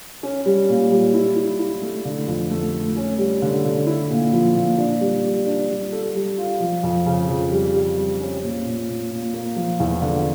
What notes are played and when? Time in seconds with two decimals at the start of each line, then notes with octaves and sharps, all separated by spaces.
0.23 C#4
0.46 G3
0.69 A#2
0.91 G3
1.14 E4
1.36 E4
1.59 E4
1.82 A3
2.05 D3
2.28 F2
2.51 A3
2.73 A3
2.96 C#4
3.18 G3
3.42 D3
3.64 D3
3.87 E4
4.10 A#2
4.33 F3
4.55 A#2
4.78 D4
5.01 G3
5.23 G3
5.47 D4
5.69 G3
5.92 A4
6.15 G3
6.38 F4
6.60 F3
6.83 F2
7.06 C#3
7.28 F2
7.52 G3
7.74 G4
7.97 G3
8.20 C#4
8.43 A#2
8.65 A#2
8.89 A#2
9.11 A#2
9.34 A#3
9.56 F3
9.80 E2
10.02 D3